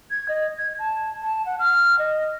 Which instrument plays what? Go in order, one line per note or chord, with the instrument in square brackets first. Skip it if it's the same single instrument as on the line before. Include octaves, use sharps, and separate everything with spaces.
[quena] G#6
D#5
G#6
A5
A5
F#5
F6
D#5